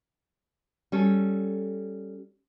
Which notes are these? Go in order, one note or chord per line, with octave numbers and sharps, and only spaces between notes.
G3 C#4 A4